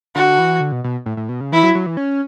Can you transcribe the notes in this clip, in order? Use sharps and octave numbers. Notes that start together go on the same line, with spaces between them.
D3 F#4
E3
D3
B2
B2
A2
A2
B2
C#3
E3 E4
F#3
F#3
E3
C#4